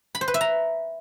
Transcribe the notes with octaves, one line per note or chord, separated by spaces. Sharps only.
B5
C5
B4
E5
A#5